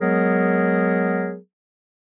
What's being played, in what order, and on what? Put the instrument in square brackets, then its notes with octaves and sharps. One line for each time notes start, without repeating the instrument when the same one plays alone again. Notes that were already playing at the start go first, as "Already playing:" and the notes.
[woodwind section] F#3 G#3 B3 G#4 A#4